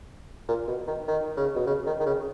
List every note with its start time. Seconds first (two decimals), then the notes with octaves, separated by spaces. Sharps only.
0.48 A#2
0.68 B2
0.87 D#3
1.08 D#3
1.37 C#3
1.55 B2
1.67 C#3
1.87 D#3
2.00 D#3
2.06 C#3